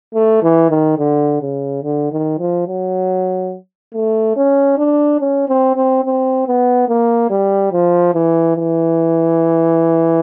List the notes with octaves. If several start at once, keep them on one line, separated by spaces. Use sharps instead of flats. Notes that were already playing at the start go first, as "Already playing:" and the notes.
A3
E3
D#3
D3
C#3
D3
D#3
F3
F#3
A3
C#4
D4
C#4
C4
C4
C4
B3
A#3
G3
F3
E3
E3